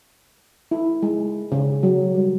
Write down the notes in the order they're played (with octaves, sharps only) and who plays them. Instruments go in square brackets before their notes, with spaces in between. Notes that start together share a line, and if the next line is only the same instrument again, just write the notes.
[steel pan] E4
G#3
C#3
F#3
G3